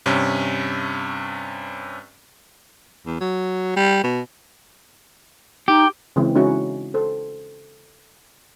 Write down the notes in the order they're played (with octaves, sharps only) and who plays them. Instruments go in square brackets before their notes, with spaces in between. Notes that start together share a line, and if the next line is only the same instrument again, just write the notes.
[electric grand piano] G2 C3 C#4
[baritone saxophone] E2
F#3
G3
B2
[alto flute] D#4 [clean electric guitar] G4
[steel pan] C#3 E3 G#3 C4
G#3 C#4 D#4 E4 F#4
A4 C5